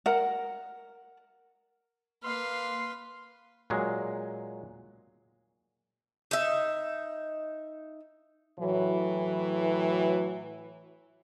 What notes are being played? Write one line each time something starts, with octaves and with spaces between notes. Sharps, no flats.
A#4 F#5
A#3 B4 F5 C6
A#2 F#3 G#3
D#4 E5
A2 E3 F#3